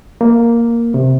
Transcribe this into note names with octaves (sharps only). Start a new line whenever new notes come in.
A#3
C3